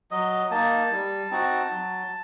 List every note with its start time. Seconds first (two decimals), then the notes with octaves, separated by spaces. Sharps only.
0.11 F#3 D#5
0.51 A#3 D#4 A5
0.91 G3
1.31 C4 D#4 F#4
1.71 F#3